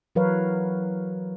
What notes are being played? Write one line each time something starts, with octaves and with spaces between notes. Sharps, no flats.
E3 F#3 A#4 B4 C#5 F5